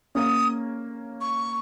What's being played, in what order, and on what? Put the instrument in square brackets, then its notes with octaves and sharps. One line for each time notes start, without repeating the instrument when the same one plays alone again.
[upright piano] A#3 C#4 [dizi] D#6
[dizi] C#6